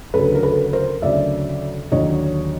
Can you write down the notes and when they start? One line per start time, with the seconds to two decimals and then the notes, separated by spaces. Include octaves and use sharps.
0.14 D2 C#3 F#3 A4 B4
0.35 A#4
0.43 A4 B4
0.73 A#4 C5
1.02 D2 C#3 F#3 D5 E5
1.92 D#2 D3 F#3 C#5 D#5